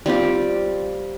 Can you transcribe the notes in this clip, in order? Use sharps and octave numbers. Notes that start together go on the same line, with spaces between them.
G3 C4 F4 G4